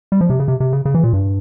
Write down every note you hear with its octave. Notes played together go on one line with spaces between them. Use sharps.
G3
F3
C3
C#3
C3
C3
C#3
C#3
E3
A#2
G2